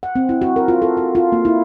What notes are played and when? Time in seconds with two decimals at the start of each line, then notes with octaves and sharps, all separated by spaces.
0.03 F#5
0.16 C4
0.29 E4
0.42 F#4
0.56 A#4
0.68 F4
0.82 A4
0.97 F#4
1.15 F4
1.32 A#3
1.45 E4